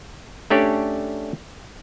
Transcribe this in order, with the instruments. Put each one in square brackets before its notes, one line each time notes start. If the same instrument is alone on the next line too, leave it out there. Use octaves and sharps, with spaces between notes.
[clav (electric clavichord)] A3 C#4 D4 G4 C#5 D5